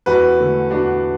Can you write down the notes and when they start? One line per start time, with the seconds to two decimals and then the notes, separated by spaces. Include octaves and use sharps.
0.06 E2 F#4 B4
0.39 D3 A3
0.71 E2 D4 F#4